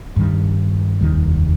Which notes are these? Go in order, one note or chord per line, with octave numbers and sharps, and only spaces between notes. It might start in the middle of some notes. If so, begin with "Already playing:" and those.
G2 D#3 G3
F1 D#2 D#3 G3